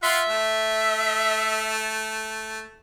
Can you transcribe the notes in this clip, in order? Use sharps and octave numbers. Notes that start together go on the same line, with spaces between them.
F4 E5 F#5 C6
A3